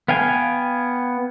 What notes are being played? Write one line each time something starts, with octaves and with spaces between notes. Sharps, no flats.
B3 F5 G5 G#5